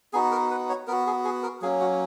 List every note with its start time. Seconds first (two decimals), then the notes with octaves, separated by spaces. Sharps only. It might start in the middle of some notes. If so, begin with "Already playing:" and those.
0.13 B3 D#4 F#4 G#4
0.31 A#4
0.51 B4
0.69 C#5
0.87 B3 F#4 A#4
1.06 G#4
1.25 G#4
1.43 A#4
1.62 F#3 A#3 C#4 G#4
1.81 F#4